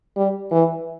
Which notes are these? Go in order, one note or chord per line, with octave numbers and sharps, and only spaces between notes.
G3
E3